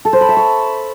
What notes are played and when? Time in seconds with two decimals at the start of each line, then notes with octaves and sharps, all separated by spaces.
0.05 A4
0.13 C5
0.21 B5
0.29 E5
0.37 C#6